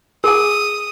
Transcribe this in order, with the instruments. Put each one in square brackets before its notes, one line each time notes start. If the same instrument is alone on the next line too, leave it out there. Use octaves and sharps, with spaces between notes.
[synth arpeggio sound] G#4 D6 [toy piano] A#4 G#5 [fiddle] D#6